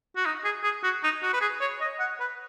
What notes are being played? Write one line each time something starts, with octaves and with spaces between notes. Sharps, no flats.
F#4
D#4
G#4
G#4
F#4
D#4
F#4
B4
G#4
C#5
D#5
F#5
B4